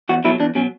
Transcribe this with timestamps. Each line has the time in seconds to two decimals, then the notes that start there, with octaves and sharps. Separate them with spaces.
0.09 E2 F#4
0.24 B2 F#3 E4
0.40 E2 D4
0.55 B2 F#3 C#4